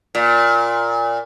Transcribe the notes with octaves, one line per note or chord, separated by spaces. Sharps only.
A#2